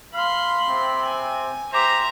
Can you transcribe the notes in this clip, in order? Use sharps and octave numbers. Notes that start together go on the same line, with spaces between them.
F5 B5 C6
C3 C4
G#5
G4 C5 E5 A#5